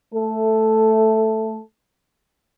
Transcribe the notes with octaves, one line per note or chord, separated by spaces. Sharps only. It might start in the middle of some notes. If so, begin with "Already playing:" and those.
A3 A4